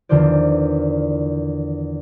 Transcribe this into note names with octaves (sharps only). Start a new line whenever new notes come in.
E2 D3 D#3 F4 C5 D5